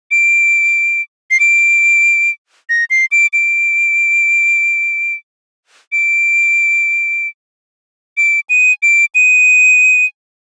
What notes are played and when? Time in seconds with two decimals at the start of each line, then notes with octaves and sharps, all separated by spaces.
0.11 D7
1.31 C7
1.40 D7
2.69 A#6
2.90 C7
3.12 D7
3.33 D7
5.92 D7
8.17 D7
8.50 D#7
8.83 D7
9.15 D#7